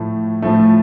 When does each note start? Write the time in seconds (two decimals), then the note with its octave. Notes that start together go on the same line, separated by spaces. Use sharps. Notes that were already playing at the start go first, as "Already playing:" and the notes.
Already playing: A2 F3 A3
0.42 A2 F3 A3